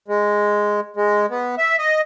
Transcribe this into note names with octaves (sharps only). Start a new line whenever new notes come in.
G#3
G#3
B3
E5
D#5